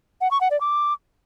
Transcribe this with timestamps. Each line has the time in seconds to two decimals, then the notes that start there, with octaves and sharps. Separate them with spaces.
0.21 F#5
0.31 C#6
0.41 F#5
0.51 D5
0.61 D6